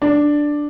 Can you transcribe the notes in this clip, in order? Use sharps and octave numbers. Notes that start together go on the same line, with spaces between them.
D4